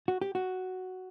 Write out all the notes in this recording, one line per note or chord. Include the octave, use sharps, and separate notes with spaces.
F#4
G4
F#4